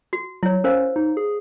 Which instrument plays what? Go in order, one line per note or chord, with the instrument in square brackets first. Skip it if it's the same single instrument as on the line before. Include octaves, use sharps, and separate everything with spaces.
[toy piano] F#4
[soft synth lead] F#3 [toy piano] E4 C#5
[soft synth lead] C#4 [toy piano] A#4 C5 F5
[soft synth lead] D#4
G#4